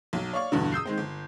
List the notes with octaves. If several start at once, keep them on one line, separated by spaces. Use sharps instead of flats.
B1 F#3
C#5 D5 F5 C#6
E2 G2 B2 D3
D#6 E6 G6 C7
D#3 G#3 C4
G1